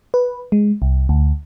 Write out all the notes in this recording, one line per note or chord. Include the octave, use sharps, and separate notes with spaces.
B4
G#3
C2
D2